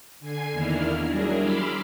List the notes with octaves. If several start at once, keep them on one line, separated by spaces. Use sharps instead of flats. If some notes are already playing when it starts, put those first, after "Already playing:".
D3 G#5 G#6 C7
E2 D#3 A#3 D4 E4 F6
F#3 G3 D4 E4 G#4 A#4
B5 C6 D6 E6 F6